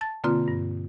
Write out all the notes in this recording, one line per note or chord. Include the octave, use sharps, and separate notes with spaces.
A5 A6
B2 D3 A#3 C4 F4
G2